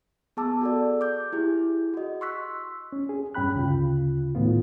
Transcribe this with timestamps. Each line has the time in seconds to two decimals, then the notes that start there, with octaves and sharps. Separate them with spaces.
0.37 B3 G#4 A5 D6 E6
0.61 F#4 A4 D5
1.01 D6 G6
1.32 E4 G4 G#4
1.94 F#4 D#5
2.21 C6 C#6 E6 F#6 B6
2.92 C#4
3.09 G#4
3.35 G2 C#4 G5 B5 F#6
3.54 D2 C#3 F4
4.35 A2 D#3 B3 F4